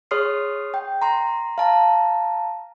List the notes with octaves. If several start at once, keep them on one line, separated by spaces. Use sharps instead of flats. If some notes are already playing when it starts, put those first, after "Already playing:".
G#4 C#5 C6 D#6 F6 C7
G5
A#5 C6
F5 A5 A#5